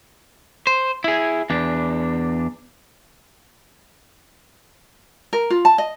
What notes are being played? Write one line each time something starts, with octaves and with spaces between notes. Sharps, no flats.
C5
E4 G#4
E2 D4
A#4
F4
A5
D#5